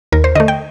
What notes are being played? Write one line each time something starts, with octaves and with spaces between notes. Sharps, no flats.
D#2 A#4
C5
D3 A3 D#5
G5